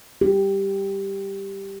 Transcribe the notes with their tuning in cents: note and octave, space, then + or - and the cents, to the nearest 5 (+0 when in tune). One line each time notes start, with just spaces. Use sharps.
G4 +0